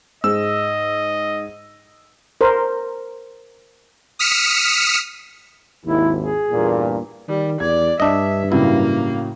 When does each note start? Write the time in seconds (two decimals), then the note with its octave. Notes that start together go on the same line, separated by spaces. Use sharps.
0.24 G#2 G#4 C5 D#5 E6
2.41 A#4 C5
4.19 D#6 F6 B6 C#7 E7
5.85 G#1 D#2 E4
6.19 G#4
6.51 E2 G2 A#2
7.28 D#3 G3
7.60 E2 D5 G#6
8.00 G2 D4 D#5 E5
8.52 A2 C#3 F#3 A#3 E4